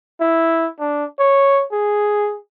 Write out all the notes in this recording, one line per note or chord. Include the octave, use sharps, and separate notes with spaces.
E4
D4
C#5
G#4